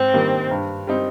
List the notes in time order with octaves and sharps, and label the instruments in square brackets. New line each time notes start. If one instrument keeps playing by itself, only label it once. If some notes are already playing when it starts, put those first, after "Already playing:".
Already playing: [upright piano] G#2 [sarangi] C4
[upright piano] D#3 G3 A#3
G2
G3 C4 D#4